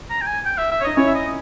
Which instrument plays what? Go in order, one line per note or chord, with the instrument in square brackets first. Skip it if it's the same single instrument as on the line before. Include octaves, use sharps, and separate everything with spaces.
[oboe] A#5
G5
G#5
G5
E5
E5
C#5
[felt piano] D#4 [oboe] D#5
[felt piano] C#4 E4 [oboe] C#5
[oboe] E5
D#5